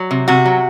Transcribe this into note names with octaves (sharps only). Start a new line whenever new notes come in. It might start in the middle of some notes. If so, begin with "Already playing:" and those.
Already playing: F#3
C3
C3 F#4
F#3